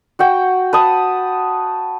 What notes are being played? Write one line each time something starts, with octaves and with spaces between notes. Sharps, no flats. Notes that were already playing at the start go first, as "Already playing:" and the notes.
F#4 F#5 G5
B4 A5 D#6